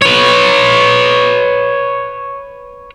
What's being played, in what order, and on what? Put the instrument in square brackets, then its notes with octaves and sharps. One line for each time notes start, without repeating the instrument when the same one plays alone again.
[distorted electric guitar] B4 C#5